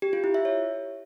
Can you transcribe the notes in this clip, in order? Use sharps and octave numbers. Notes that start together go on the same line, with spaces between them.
G4
F4
E4
E5
C#5